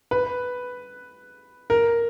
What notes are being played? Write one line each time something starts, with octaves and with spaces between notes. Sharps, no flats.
B4
A#4